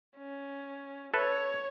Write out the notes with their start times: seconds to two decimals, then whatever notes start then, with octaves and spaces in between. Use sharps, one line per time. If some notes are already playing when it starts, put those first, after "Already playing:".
0.16 C#4
1.14 A4 B4 C#5 E5